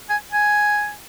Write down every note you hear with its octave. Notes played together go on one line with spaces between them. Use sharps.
G#5
G#5